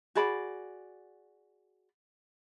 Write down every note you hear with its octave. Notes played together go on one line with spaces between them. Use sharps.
F#4 G#4 D5 B5